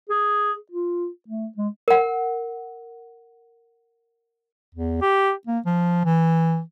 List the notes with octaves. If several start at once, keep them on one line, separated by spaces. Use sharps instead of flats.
G#4
F4
A3
G#3
A#4 F#5
E2
G4
A#3
F3
E3